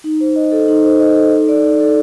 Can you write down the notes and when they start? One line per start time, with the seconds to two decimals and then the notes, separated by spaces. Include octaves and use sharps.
0.04 D#4
0.21 C5
0.36 D#5
0.52 A4
0.68 D#4
0.84 C5
1.00 D#5
1.16 A4
1.32 D#4
1.49 D5
1.64 D#4
1.80 A4